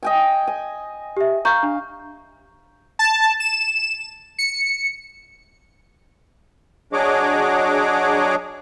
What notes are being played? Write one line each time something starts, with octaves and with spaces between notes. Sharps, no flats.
D#5 G5 G#5
G#5
G4 E5
F5 A#5 C#6 G6
D4
A5
E7
C#7
F#3 D4 G#4 C#5 D#5 D6